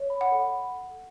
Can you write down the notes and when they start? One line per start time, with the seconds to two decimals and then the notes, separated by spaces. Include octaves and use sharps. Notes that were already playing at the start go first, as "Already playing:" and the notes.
Already playing: C#5
0.10 B5
0.21 F#5
0.32 A4